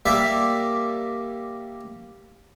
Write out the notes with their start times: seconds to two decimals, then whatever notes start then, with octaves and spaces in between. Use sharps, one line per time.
0.06 G3 A#3 D5 E5